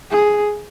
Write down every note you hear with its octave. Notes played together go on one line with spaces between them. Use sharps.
G#4